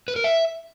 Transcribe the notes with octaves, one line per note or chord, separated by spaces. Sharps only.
B4
A#4
E5